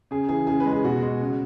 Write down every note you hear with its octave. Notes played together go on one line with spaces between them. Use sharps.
C#3 G#4
E3 G#4
C#3 G#4
B4
G#3
G#4
B2 F#4
G#3
C#3